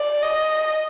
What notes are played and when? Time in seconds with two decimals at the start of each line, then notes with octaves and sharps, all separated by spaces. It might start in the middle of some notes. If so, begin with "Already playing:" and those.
Already playing: D5
0.23 D#5